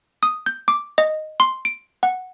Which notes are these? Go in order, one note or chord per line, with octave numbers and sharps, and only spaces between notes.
D#6
G6
D6
D#5
C6
D7
F#5